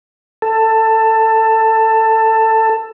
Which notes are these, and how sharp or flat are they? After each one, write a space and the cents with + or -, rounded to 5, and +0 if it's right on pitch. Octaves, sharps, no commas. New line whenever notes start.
A4 +15